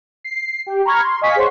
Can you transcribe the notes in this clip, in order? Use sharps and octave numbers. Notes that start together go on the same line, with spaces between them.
C7
G4 G5
A#5 B5 C#6 F6 G#6
C6
D#5 F5 G#5 C#6 B6
G#4 C5 C#5 F#5 C6 C#6